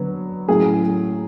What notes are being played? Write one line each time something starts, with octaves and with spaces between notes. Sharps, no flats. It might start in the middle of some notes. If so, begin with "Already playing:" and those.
Already playing: D3 F#3 B3
A2 F#3 A3 C#4 G#4